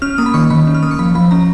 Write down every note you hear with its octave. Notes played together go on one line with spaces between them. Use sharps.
C#4 F6
A#3 D#6
B5
D#3 C#6
D#3 B5
C#4
F6
A#3 D#6
C#6
F3 B5
F3 B5
C#4 A#5